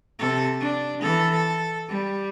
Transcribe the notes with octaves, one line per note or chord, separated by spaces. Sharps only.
C3 A4
D4
E3 A4
A4
G3